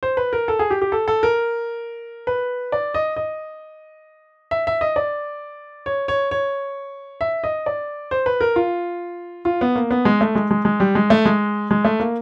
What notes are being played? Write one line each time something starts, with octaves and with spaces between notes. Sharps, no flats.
C5
B4
A#4
A4
G#4
G4
G4
A4
A4
A#4
B4
D5
D#5
D#5
E5
E5
D#5
D5
C#5
C#5
C#5
E5
D#5
D5
C5
B4
A#4
F4
F4
B3
A#3
B3
G#3
A3
G#3
G#3
G#3
G3
G#3
A3
G#3
G#3
A3
A#3